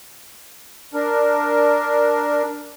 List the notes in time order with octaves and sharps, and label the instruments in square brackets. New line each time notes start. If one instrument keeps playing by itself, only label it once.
[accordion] D4 A#4